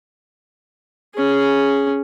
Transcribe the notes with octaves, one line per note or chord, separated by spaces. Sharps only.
C#4 G#4